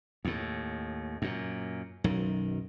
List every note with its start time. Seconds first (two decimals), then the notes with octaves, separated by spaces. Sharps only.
0.25 D#2 A2
1.22 F#2 A#2
2.04 B1 F#2 D#3